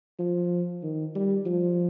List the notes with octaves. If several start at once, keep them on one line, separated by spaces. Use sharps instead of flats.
F3
D#3
G3
F3